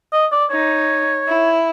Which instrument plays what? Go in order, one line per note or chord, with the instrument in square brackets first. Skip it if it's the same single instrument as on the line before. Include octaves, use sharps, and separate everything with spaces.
[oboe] D#5
D5
[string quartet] D#4 [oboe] C#5
[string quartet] E4